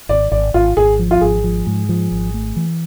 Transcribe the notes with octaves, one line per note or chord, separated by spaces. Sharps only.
G#1 D5
G#1 D5
G#1 F4
G#1 G#4
F3
F4
G#1 G#4
F3
G#2
F3
G#1
A3
E3